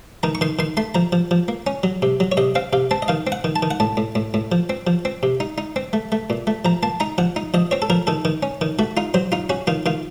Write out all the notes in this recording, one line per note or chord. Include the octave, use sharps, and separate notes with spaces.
D#3 A#5
C#6
D#3 C6
D#3 C6
A3 C6
F3 A#5
F3
F3
A#3
C#4
F#3
C3
F#3
C#5
C3 D#5
C4 F5
C3 F5
C4 A5
D#5
D#3 F5
C4
F#5
D#3
A5
D#3
F#5
A2 A5
A2
A2
A2
F3
C4
F3
C4
C3
D#4
D#4
C4
A3
A3
A#2
A3
F3 A#5
A#3 A5
D#4 A#5
F3 F#5
D#4
F3 D#5
C4 C#5
A4
F3 A#4
D#3 A4
D#3
C#4
D#3
A3 F#4
D#4 F4
F#3 C5
D#4 F4
C#4 F#4
D#3 F4
D#3 F4